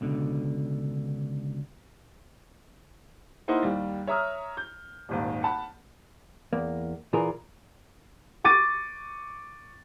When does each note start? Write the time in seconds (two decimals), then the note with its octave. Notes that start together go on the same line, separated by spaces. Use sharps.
0.01 C#2 B2 D3
3.48 A#3 D#4 E4 C5 F#5
3.63 D#2 G3
4.07 C#5 E5 A#5 D#6 F6
4.57 G6
5.09 D#1 G#1 D#2
5.43 F#5 A5 B5
6.53 E2 A#3
7.13 A#2 E3 F4 G#4 A#4
8.44 C#6 D6 A6 D#7